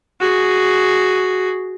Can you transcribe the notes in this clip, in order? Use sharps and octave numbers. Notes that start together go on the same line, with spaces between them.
F#4 G#4